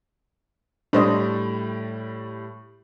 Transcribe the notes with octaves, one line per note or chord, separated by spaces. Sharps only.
A2 G3 D4 C5 D#5